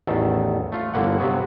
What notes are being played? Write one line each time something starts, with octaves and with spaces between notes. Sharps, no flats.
A1 E2 D#3 A4 A5
A3 F4
G1 D3 E3 A#3 F#5
G2 C3 F#3 B3 F#4